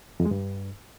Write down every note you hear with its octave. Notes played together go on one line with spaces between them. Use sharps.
F2
G#3
G2